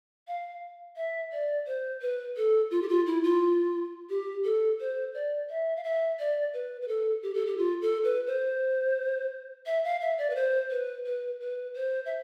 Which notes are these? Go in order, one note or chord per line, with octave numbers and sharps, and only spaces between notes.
F5
E5
D5
C5
B4
A4
F4
G4
F4
E4
F4
G4
A4
C5
D5
E5
F5
E5
D5
B4
B4
A4
G4
A4
G4
F4
A4
B4
C5
E5
F5
E5
D5
B4
C5
B4
B4
B4
C5
E5